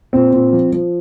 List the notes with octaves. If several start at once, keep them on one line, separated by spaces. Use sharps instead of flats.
A#2 C4
A#2
F3
F3